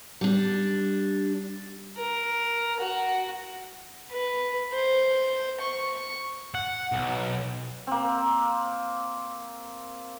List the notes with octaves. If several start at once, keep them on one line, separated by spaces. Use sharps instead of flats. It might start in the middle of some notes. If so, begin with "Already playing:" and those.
G3 D4
A#4
F#4
B4
C5
C#6
F#5
B1
A#3 C4